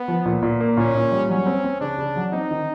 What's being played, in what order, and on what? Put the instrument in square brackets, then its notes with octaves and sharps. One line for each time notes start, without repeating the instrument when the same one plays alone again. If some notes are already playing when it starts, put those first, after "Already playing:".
Already playing: [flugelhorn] B3
[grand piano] F3
A#2
A#2
A#3
[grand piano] A#2 [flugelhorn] C#4
[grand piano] A#2
G3
[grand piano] F#3 [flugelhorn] C#4
[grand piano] C4
C4
[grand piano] C#3 [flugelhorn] D4
[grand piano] C#3
F#3
[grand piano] C4 [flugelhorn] D#4
[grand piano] D#3